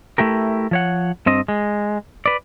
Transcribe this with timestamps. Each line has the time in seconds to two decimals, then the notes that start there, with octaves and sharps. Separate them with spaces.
0.18 A3 E4 G4 A#4
0.71 F3 C#5 F#5
1.26 G2 C4 D#5
1.48 G#3
2.26 B4 D5